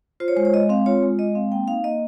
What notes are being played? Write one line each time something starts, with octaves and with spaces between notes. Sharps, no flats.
F4 C5
C#5
G#3 C5
C#5
G#3 D#5
C4 F5
F4 C#5
G#3
G#3 D#5
C4 F5
A#3 G5
D#4 F5
A#3 D#5